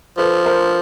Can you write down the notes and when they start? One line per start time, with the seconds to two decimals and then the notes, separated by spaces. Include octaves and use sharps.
0.18 F3 A4 B4
0.46 A#4 C5